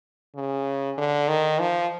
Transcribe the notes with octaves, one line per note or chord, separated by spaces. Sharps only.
C#3
D3
D#3
F3